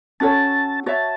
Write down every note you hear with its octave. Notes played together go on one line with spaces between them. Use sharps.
C#4 F#4 A4 C#5 A5
F#4 C#5 E5 A5